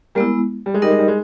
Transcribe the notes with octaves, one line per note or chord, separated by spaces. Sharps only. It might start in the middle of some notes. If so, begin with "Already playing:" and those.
G3 G#3 A#3 B3 E4
G3
G#3
G3 D#4 A#4 D#5
G#3
G3
G#3